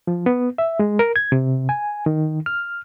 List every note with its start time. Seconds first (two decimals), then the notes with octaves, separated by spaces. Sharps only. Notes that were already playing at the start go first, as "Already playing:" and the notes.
0.07 F3
0.26 B3
0.58 E5
0.79 G#3
0.99 A#4
1.16 G#6
1.32 C3
1.69 G#5
2.06 D#3
2.46 F6